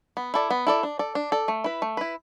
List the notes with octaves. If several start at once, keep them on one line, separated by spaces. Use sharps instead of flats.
B3
E4 A4 D5
B3
E4 A4 D5
D4
A4 D5
D4
A4 D5
A3
E4 B4
A3
E4 B4